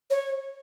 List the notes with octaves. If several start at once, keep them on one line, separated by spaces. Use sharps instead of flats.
C#5